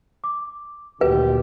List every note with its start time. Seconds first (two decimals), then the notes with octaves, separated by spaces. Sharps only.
0.24 D6
1.01 D2 A#2 D#3 F#4 G4 B4